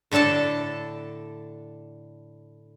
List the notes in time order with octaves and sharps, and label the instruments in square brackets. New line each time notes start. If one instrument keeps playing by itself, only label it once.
[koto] A2 D3 D4 A4 A5